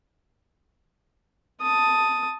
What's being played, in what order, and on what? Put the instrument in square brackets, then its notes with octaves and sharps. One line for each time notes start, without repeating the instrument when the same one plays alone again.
[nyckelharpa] A5 D#6